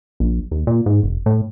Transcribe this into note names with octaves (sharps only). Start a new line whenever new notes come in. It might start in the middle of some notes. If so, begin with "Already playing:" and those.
A#1
D#2
A#2
G#2
F1
A2